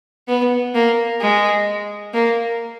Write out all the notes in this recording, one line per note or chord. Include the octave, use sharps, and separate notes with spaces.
B3
A#3
G#3
A#3